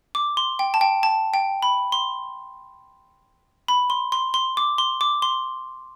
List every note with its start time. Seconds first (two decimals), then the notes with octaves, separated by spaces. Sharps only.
0.15 D6
0.37 C6
0.59 G5
0.74 A5
0.81 G5
1.03 A5
1.34 G5
1.63 B5
1.92 C6
3.68 B5
3.90 C6
4.12 C6
4.34 C6
4.57 D6
4.78 C6
5.01 D6
5.22 C6